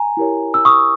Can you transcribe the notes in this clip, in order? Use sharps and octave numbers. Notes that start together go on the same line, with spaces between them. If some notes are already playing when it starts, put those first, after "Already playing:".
Already playing: G#5 A#5
E4 G4 A#4 C#5
E6
C#6 D#6